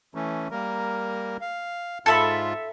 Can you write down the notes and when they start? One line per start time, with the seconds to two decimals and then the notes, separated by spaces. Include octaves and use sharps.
0.15 E3 A3 C#4
0.51 G3 A#3 A#4
1.41 F5
2.06 G#2 F4 A4 E5 B5